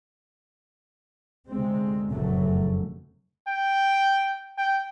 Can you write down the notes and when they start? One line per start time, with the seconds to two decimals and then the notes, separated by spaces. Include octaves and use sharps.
1.50 D2 C3 G#3 C4
2.11 F1 F#2 A2 C#3 F#3 A3
3.47 G5
4.58 G5